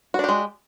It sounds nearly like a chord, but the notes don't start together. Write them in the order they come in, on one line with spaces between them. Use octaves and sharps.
F#4 D4 G4 G#3